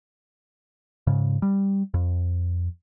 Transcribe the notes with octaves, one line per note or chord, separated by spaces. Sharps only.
G#2 C#3
G3
F2